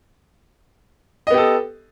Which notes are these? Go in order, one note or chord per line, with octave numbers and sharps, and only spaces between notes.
B3 G4 A4 D#5